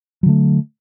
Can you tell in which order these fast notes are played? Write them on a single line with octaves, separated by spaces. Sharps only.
F#3 D3 A3